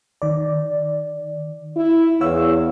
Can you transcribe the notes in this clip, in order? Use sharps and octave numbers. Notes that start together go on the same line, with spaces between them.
D#3 D5
E4
E2 C#5 F5 E6